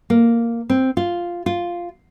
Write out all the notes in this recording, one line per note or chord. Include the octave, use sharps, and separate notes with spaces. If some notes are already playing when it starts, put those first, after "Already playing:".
A#3
C4
F4
F4